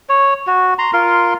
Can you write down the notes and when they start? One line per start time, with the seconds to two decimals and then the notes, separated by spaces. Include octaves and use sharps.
0.09 C#5
0.47 F#4
0.79 A#5 C6
0.93 F4 A#4 C6